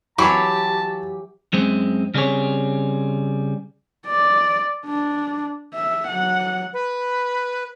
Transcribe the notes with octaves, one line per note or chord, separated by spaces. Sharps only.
E3 F#3 G4 C#5 A5 B5 C#6
F#2 G#3 C4
C#3 G3 C4 G#4 C#5
D5
D4
E5
F#3 F#5
B4